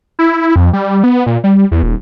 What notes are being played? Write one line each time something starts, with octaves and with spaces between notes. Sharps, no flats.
E4
F2
G3
B3
A#2
G3
E2
D#1